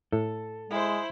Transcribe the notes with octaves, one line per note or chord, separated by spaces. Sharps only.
A2 A4
G#3 E4 C5